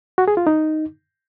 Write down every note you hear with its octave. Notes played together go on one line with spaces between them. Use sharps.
F#4
G#4
F4
D#4